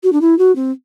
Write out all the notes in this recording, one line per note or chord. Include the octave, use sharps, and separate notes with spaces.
F#4
D4
E4
F#4
C4